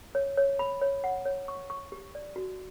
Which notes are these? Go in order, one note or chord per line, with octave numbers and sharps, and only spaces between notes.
C#5
C#5
B5
C#5
F#5
C#5
C#6
C#6
G4
D5
F#4